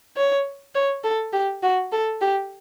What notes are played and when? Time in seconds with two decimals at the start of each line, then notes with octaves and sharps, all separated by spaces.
0.17 C#5
0.75 C#5
1.04 A4
1.33 G4
1.63 F#4
1.93 A4
2.22 G4